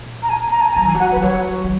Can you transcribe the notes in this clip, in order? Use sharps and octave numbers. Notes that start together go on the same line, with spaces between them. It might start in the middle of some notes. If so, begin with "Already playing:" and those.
Already playing: A#2
A#5
G#5
A#5
G#5
G#5
F#3 A#5
E3 G#5
F#3 F#5
B4
E3
F#3 C#5
F#3